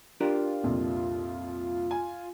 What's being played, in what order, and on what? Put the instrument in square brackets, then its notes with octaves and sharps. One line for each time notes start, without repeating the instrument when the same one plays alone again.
[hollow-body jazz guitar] D4 G4 A#4 [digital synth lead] F4
[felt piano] C2 F2 A#2
G#5